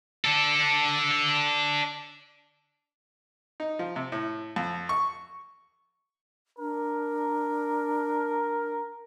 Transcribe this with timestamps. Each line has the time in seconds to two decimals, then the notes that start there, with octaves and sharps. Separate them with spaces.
0.25 D4 A4
3.60 D#4
3.79 F3
3.96 C3
4.12 A2
4.56 F2
4.89 C#6
6.59 D4 A#4